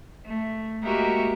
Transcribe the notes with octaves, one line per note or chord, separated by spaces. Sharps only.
A3
G#3 A#3 F#4 G4 A#4 E5